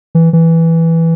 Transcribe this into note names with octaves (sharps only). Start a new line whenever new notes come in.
E3
E3